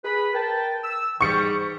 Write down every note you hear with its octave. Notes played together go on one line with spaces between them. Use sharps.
G#4 B4 B5
A#4 G5 A5
E6
G#2 E3 G3 C#6 C#7